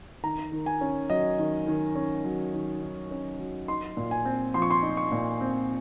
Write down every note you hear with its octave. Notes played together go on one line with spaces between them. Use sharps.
D#3 A#5
D#3
G#5
C#4
F#3 D#5
D#3
D#3
C#4
F#3
D#3
D#3
C#4
F#3
D#4 C6
A#2
G#5
C4
F3 C6
C#6
C6
D#4
C#6
A#2
C4